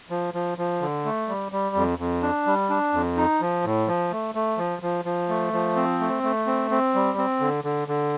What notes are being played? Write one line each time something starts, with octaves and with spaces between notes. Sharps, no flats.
F3
F3
F3
D3
A3
G3
G3
F2
F2
D4
G3
D4
F2
D#4
F3
A2
F3
A3
A3
F3
F3
F3
A3
F3
C4
A3
A3
C4
C4
G3
C4
D3
D3
D3